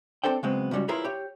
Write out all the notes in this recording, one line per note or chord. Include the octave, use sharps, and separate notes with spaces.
C4 D4 E4 A4 C5 G5
C#3 F#3 G#3 B3 C4
C#2 F#2 G3 C#4 F#4
E4 F4 G#4 A#4 B4 C#5
G4 C#5